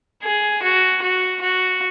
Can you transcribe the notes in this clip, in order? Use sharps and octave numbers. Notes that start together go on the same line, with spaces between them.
G#4
F#4
F#4
F#4